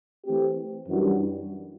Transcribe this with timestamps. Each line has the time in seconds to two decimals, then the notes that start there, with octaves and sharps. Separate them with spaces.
0.25 E3 A3 C4 G4
0.88 F#2 E3 G3 D4 F#4